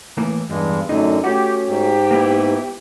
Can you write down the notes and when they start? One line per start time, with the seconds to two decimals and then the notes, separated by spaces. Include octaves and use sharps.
0.17 A2 E3 A#3
0.50 E2 G2 G#3
0.89 F#2 A2 D3 D#4
1.24 A3 C#4 F#4 G4
1.68 G#2 G4
2.11 A#3 B3 E4